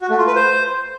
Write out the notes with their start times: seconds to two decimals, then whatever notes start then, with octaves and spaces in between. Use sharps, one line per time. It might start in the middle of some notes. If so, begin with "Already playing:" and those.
0.01 F#4
0.10 A3
0.18 F4
0.27 B4
0.35 C5